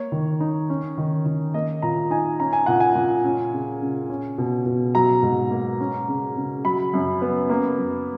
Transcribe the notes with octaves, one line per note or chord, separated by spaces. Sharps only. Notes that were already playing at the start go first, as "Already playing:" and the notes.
Already playing: A#3 C#5
D#3
D#4
C#4
D#3
D#3
A#3 D#5
A#2 A#5
D#4 G#5
C#4 A#5
G#5
A#2 F#5
G#5
A#2
C#4
C#3
C#3
C#4
B2
B2
F#3 A#5
G#2
A#3
C#4
C#3
C#3
F#3 B5
F#2
B3
A#3
F#2